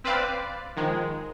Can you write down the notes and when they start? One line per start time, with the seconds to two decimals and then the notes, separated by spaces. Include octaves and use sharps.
0.04 C4 B4 C5 D5 F5
0.77 D#3 F3 G#3